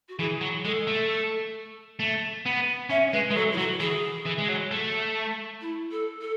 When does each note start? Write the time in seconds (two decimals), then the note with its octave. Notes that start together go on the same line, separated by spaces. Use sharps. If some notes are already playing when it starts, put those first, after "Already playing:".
0.09 F#4
0.19 E3 G#4
0.41 F#3
0.65 G#3 A4
0.87 A3
2.00 A3
2.46 B3
2.90 C#4 E5
3.12 G#3 B4
3.31 G#3 B4
3.36 F#3 A4
3.53 E4
3.57 F#3 F#4
3.80 E3 G#4
4.26 E3
4.39 G#3
4.49 F#3
4.71 A3
5.61 E4
5.91 A4
6.21 A4